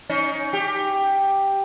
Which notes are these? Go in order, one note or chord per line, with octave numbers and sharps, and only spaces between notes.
C#4 D#4
G4